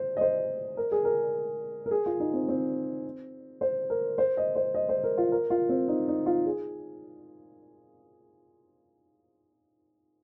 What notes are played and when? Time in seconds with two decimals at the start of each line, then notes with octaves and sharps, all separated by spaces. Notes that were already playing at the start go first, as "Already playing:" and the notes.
Already playing: C5
0.17 D#5
0.21 C5
0.77 A#4
0.92 G#4
1.05 A#4
1.86 A#4
1.91 G#4
2.06 F4
2.20 D#4
2.33 C4
2.48 C4
3.61 C5
3.90 A#4
4.18 C5
4.37 D#5
4.56 C5
4.74 D#5
4.89 C5
5.04 A#4
5.18 F4
5.32 A#4
5.50 F4
5.69 C4
5.88 D#4
6.08 D#4
6.26 F4
6.46 G#4